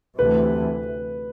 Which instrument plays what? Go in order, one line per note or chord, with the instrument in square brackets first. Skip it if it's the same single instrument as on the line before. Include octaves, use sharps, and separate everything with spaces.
[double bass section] D2 C3 E3 A3 [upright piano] B4